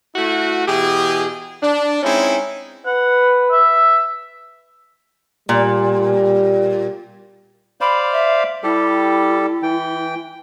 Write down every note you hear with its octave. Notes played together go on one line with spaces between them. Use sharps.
A3 E4 F#4
B2 E3 G4 G#4
D4
G#3 C4 C#4 D#4 E4
B4 F#5
E5
A#2 G3
C5 D5 F5 B5
E5
G3 E4 G4 A4
E3 G5